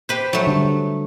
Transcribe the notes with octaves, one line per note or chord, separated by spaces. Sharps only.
G4 B4 C5 G6
F#3 A3
D3 G3